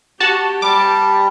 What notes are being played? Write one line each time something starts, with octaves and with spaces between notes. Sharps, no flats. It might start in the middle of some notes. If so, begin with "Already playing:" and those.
F#4 G4 A5
G3 A5 D6